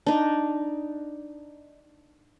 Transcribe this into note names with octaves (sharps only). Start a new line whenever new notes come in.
D4 D#4